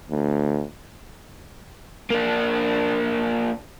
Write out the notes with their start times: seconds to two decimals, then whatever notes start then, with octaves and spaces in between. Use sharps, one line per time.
0.11 D2
2.10 A#3 D4